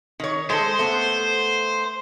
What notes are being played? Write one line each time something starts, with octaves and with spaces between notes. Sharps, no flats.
D#3 C#5
G#3 A4 C5
A3 B3